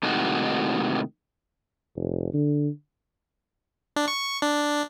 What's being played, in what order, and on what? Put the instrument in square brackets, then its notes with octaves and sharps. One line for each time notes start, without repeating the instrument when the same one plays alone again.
[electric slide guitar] A2 C3 D#3 G#3 D#4 F#4
[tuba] F1
D3
[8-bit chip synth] D4
C#6
D4